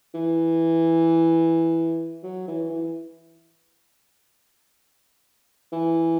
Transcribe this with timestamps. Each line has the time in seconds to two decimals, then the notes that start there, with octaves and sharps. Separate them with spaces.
0.15 E3
2.24 F#3
2.48 E3
2.70 E3
5.73 E3